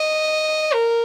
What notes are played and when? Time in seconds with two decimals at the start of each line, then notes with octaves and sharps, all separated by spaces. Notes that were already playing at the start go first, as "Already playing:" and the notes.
Already playing: D#5
0.74 A#4